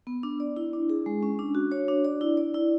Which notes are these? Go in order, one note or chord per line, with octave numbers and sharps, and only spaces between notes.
B3
D4
D5
E4
D4
G#4
G#3
C#4
D4
F#4
C#5
D4
D5
E4
D5
E4